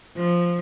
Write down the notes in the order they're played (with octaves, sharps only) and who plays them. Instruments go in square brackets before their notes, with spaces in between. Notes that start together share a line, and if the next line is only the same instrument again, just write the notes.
[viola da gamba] F3